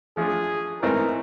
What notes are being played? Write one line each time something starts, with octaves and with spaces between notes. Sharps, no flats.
F3 A3 D4 F4 G#4
G#2 E3 A3 C4 D#4 A#4